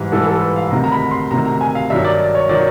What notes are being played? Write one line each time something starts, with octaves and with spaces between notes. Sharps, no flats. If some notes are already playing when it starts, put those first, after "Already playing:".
Already playing: G#2 E3 G3
G#2 E3 G3 A4
A4
B4
F5
D2 C3 D#3 A#5
A#5
B5
C6
D2 C3 D#3 A#5
A#5
G#5
F5
G2 D#3 F#3 E5
D5
D5
C#5
D#3 F#3 D5